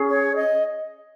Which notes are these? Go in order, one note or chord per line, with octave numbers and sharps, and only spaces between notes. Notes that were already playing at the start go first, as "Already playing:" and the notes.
Already playing: C#4 G#4
C#5
D#5